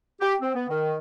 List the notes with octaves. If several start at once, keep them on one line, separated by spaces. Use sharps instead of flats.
G4
C4
B3
D#3